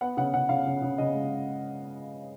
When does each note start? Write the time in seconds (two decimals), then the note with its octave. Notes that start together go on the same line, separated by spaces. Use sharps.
0.01 B3 F#5
0.17 C#3 F#5
0.33 C#3 F#5
0.49 C#3 F5
0.66 C#3
0.82 C#3
0.98 C#3 D#5
1.14 G#3